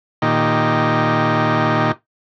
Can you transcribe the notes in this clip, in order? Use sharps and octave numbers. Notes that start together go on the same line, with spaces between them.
A#2 D#3 D#4 G4